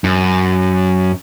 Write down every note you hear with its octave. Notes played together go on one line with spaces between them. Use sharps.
F#2